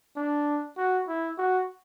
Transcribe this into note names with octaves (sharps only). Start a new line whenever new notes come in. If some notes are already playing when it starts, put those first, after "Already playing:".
D4
F#4
E4
F#4